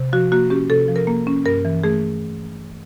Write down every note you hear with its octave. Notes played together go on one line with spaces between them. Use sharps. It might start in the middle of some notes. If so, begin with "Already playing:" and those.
Already playing: C3
F3 F#4
A#3 F#4
C#4 G4
C3 A4
F3
A#4
A#3
C#4
G2 A#4
E3
A3 G#4